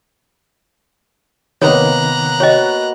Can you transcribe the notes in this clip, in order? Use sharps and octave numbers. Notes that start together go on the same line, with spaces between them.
C3 D#3 A#3 B3 C#5 A#5 F#6
F#4 C#5 D#5 G5